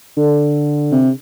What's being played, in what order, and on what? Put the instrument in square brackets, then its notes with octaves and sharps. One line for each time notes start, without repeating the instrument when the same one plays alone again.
[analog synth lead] D3
[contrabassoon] C3